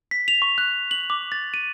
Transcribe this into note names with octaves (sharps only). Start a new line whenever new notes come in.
B6
F7
C#6
F#6
F#7
D6
A6
D#7